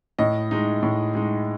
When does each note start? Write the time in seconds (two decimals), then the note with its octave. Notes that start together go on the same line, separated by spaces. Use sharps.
0.19 A2 D#5
0.51 G#3 D#4
0.83 A2
1.15 G#3 D#4